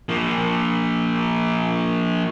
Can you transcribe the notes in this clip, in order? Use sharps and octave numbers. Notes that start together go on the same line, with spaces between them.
F3 A#3